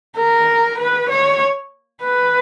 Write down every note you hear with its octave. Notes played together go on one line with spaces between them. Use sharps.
A#4
B4
C#5
B4